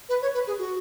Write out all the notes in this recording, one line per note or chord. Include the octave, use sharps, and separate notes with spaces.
B4
C#5
B4
G#4
F#4